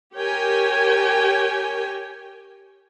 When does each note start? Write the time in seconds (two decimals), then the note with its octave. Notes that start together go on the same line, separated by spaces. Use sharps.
0.15 G4 A#4 C#5 G5 G#5